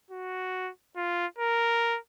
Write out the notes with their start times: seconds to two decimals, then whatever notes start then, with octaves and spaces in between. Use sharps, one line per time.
0.11 F#4
0.96 F4
1.38 A#4